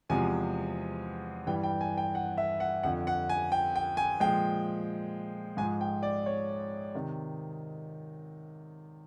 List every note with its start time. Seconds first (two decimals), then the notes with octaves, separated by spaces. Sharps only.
0.09 E2 C3 F3 G#3 G#5
1.47 G2 E3 G3 G5
1.64 G5
1.81 G#5
1.98 G5
2.15 F#5
2.38 E5
2.60 F#5
2.83 F2 D3 F3 F#5
3.07 F#5
3.29 G#5
3.52 G5
3.76 G5
3.97 G#5
4.20 A#2 F3 G#3 G5
5.57 G#2 F3 G#3 G#5
5.81 G5
6.03 D5
6.26 C#5
6.94 C3 D#3